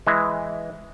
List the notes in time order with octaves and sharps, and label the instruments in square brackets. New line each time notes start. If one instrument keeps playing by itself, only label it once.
[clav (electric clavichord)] E3 G#3